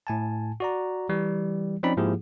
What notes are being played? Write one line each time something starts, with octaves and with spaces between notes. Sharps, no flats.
A2 G#5 A5
F#4 D5 A#5
E3 G3
F3 C4 C#4 D#4 D5 B5
G#2 F3 A#3 E4 G4 G#4